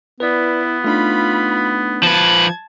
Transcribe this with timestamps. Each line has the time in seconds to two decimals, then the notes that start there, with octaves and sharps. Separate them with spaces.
0.20 B3 E4 B4 D5
0.85 A3 D4 D#4 F4 B5
2.03 F3 B4 A5 G#6